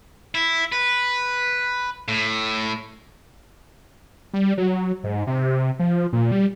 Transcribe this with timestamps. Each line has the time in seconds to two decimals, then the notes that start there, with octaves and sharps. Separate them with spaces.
0.35 E4
0.72 B4
2.08 A2
4.34 G3
4.58 F#3
5.04 G#2
5.27 C3
5.79 F3
6.13 A#2
6.32 G3